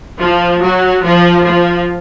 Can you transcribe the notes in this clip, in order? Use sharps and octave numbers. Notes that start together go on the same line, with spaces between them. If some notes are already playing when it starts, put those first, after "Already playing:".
F3
F#3
F3
F3